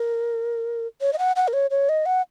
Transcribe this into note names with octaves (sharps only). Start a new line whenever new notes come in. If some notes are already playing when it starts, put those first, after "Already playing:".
Already playing: A#4
C#5
D#5
F#5
F#5
A#4
C#5
C#5
D#5
F#5